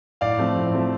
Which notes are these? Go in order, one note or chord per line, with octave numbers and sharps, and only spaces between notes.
A2 D5 F5
F3 A3 C4
A2
F3 A3 C4